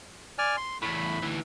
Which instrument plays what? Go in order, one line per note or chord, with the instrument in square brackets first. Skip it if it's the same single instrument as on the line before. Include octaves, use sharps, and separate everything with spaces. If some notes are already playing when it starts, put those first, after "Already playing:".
[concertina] D5 G#5 F6
C6
[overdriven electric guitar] E2 A2 [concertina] B5
[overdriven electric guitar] D2 E3